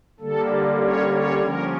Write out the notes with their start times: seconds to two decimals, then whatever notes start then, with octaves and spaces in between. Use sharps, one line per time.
0.20 D3 G3 A#3 A4
0.81 C#4 C#5
1.12 C#4 C#5
1.42 F3 A#3 C#4 A#4